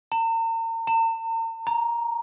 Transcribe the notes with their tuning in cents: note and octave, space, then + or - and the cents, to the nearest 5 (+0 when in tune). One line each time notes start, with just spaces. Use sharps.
A#5 -40
A#5 -45
A#5 +10